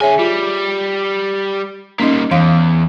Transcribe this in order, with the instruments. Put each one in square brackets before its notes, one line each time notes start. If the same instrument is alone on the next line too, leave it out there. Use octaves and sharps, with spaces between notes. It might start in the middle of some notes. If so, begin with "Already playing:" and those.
[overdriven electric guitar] D3 G#5 [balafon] G#4 C#5 E5
[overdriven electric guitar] G3 [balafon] F4
[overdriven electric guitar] G3 A#3 [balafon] C#4 D#4 D#5
[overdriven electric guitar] E2 [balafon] E3 F5